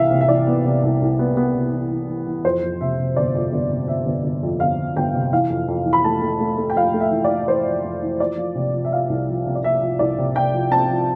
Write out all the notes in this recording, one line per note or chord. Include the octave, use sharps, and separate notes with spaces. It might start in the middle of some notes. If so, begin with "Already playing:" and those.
Already playing: C2 C3 E3 E5 F5
C3
E5
E3 D5
B3
C3
C2
C2
B3
B3
C3
E3
E3
E3
E3
F2 C5
F2
C3 E5
C3
G1 D5
F2
G1
C3
G1 E5
G1
G1
F2
G1 F5
G1
G1 G5
C3
E3 F5
F2
F2
E3
B5
A3 A5
A3
A3
A3
G5
F2 F5
A3
E5
E3
D5
E3
E3 C5
F2
F2
E3
F3 D5
F3
C3
F3
E5
F3 F5
C2
F3
C3
D5
C3 E5
F3
C2 D5
C3
C3 G5
F3
C4 A5
F3